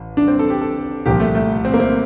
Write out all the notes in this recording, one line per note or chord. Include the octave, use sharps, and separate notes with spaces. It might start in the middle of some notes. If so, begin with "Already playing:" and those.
Already playing: A1
D4
C4
A4
G4
A4
C2 A#2 F3 G4
A3
A3
C4
A#3
C4